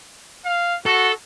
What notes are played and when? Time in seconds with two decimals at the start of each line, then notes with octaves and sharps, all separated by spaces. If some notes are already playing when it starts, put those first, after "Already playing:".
0.45 F5
0.86 F#4 A4